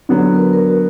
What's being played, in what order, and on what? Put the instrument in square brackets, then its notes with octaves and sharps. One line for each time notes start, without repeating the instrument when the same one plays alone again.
[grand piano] D3 F#3 B3 [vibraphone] D5
[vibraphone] A#4
B4
A#4
F#4